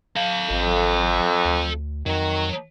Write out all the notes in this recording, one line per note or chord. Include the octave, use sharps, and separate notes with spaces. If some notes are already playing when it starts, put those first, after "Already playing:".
A4 F5
G#1 F2
D2
F2 D#3 F#3